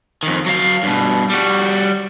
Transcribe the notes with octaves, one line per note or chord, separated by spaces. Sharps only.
F2 D#3
F#3 F5
G2 B2
G3 F#4